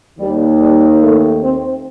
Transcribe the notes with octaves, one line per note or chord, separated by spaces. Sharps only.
D#2 D#3 G3
G3
A3
C4